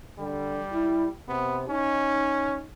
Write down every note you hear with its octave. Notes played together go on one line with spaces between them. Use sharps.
D3 G3
E4
C3 B3
C#4 D#4